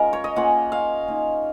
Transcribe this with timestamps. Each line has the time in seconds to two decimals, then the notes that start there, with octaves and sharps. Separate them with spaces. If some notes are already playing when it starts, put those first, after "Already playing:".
Already playing: G#3 C#4 F4 A#4
0.13 C#5
0.24 D#5
0.36 A#3 C#4 F4 F#5
0.72 F5
1.08 A#3 D#4